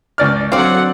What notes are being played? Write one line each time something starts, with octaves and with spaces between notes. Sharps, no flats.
C#2 D5 F6
D3 F#3 C4 D5 F5 F#5